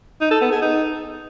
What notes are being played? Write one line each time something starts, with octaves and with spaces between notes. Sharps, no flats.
D#4
A4
B3
G#4
D#4